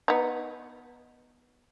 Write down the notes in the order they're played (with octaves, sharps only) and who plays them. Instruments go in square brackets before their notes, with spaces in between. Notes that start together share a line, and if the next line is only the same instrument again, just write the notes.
[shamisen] B3 D#4